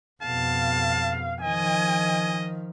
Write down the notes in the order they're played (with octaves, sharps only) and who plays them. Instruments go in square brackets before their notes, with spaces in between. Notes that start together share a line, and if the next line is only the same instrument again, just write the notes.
[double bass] F2 B2 [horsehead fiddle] F5 [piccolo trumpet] A5
[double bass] D#3 F3 [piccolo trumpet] D#5 [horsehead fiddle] G#5